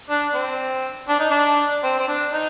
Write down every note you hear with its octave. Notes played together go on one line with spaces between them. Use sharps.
D4
C4
D4
D#4
D4
C4
C4
D4
D#4